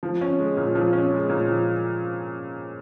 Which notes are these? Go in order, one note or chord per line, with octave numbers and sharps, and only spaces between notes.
F3
C#4
G#3
A#2
F3
C#4
G#3
A#2
F3